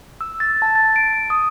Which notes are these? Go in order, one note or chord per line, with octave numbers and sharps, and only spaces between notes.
E6
A6
A5
A6
D7
D#6